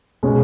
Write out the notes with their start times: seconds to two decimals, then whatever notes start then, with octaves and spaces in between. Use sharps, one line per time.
0.23 B2 G#3 C#4